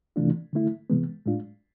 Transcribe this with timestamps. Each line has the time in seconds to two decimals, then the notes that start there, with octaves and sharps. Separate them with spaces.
0.16 C3 E3 A3 D4 F4
0.53 D3 A3 E4
0.90 C3 E3 G#3 B3
1.26 A2 G#3 D4 F4